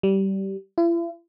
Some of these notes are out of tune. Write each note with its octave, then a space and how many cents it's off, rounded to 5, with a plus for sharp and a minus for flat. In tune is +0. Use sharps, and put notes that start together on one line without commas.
G3 -20
E4 +45